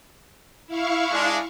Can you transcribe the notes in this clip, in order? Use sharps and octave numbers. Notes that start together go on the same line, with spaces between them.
E4 F5 C#6
G#3 D4